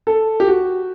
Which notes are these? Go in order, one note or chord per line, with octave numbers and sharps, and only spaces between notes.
A4
G4
F#4